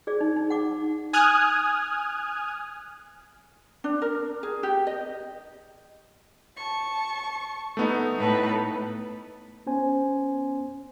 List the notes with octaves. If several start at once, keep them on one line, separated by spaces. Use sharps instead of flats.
G#4 D5
D#4
D#4
F#5 D6
G#5 D#6 F6 F#6 G#6
D4
A#4
G#4
G4
D#5
A5 C#6
A3 B3 D#4
A2 A4 B4
B3 C#4 C5 G#5